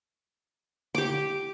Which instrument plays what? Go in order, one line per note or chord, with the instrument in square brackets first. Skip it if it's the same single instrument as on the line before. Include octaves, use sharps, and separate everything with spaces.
[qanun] G4 D6